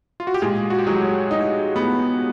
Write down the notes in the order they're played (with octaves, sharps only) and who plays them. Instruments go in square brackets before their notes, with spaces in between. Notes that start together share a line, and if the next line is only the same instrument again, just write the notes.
[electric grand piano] F4
F#4
G4
[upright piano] A#2 [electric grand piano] G#3 G#4
[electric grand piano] F#4
G4
[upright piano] F#3 [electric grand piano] G#3 G#4
[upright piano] D#4
B3